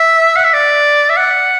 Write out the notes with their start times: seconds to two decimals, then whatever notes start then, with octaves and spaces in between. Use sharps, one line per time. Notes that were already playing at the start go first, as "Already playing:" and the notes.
Already playing: E5
0.36 F#5
0.44 E5
0.53 D5
1.09 E5
1.17 F#5